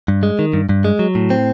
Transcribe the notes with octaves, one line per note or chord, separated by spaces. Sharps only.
G2
G#3
D#3
G2
G2
G#3
F#3
A2
C4